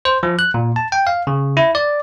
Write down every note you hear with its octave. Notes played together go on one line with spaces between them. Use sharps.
C5
F3
F#6
A#2
A5
G5
F5
C#3
E4
D5